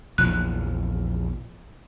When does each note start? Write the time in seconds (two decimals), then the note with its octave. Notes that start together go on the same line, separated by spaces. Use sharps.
0.18 A#1 E2 F3 F#6